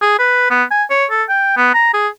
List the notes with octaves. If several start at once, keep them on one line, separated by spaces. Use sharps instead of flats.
G#4
B4
B3
G#5
C#5
A4
G5
B3
A#5
G#4